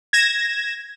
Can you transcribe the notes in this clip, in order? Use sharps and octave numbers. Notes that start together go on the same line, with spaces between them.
G#6 A#6 E7